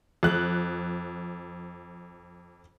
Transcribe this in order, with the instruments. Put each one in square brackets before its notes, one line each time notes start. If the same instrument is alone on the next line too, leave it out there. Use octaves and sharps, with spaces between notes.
[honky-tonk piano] F2 F#6